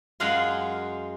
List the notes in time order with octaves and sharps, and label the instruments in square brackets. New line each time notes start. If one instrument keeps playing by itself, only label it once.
[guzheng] F#2 G#3 F4 F5 F#5 C6